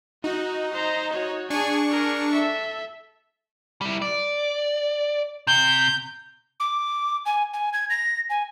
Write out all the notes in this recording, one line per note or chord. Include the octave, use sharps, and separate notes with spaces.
D#4 F#4
C5 A#5
F#4 C#5
D4 G#4 G#5 C#6
G#4 A#4
A4 E5
G3 E4
D5
C3 G6
D6
G#5
G#5
G#6
A#6
G#5